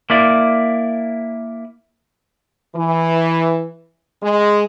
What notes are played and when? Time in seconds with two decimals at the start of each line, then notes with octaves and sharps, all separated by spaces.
0.10 A#3 E4 D5
2.76 E3
4.22 G#3